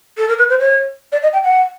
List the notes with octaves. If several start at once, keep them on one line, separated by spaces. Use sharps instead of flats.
A4
A#4
B4
C5
C#5
D5
D#5
G5
F#5